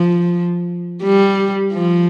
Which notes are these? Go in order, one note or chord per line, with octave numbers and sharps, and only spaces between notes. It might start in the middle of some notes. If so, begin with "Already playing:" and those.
Already playing: F3
G3
F3